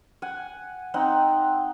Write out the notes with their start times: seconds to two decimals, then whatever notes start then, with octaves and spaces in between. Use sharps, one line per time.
0.22 F#5 G#5
0.94 C4 D#4 F#5